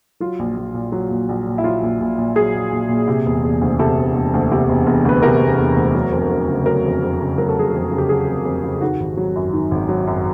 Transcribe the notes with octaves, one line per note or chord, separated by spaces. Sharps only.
F#3 F4
A#1
A#1
A#2
F#3
A#1
A#1
A#2
E4
F#3 F4
A#1
A#1
A#2
F#3 G#4
A#1
A#1
A#2
C3
E1
E1
D2
C3 A4
E1
E1
D2
C3
E1
E1
D2 B4
C3 A#4
E1
E1
D2
F#3
F2
F2
C#3
F#3 A#4
F2
F2
C#3
F#3 A#4
A4
F2 G#4
F2 A4
C#3
G4
F#3 G#4
F2
F2
C#3
D#3 F#4
G#1
F#3
F#2
D#3
G#1
F#3
F#2